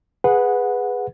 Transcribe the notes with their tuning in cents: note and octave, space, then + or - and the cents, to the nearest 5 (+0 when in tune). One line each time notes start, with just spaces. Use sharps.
G#4 -5 B4 +0 F#5 -15